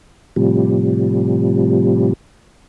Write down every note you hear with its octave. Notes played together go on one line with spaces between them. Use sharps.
A2 C3 F3 G3